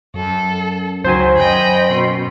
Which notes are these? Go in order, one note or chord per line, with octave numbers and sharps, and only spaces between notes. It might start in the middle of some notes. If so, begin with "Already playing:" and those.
F#2 A4
C#2 D#3 F#3 C5 G#5
F#2 D#5 G5 B5
B2 C6